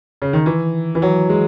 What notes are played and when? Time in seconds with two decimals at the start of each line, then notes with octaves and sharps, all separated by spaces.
0.22 C#3
0.33 D#3
0.46 E3
0.95 E3
1.02 F#3
1.29 G#3